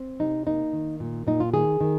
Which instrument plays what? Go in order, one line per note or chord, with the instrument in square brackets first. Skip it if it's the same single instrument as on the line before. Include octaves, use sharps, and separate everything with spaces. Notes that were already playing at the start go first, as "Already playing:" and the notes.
Already playing: [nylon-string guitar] C4
C3 D#4
A#3 D#4
D#3
A#2
A#2 D#4
F4
D#3 G#4
D#3